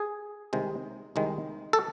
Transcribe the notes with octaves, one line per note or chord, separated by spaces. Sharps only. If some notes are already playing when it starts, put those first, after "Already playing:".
Already playing: G#4
C2 C3 D#3 G#3
C2 C3 D#3 G#3
A4